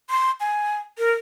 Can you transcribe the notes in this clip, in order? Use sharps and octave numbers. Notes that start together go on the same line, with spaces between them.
C6
G#5
A#4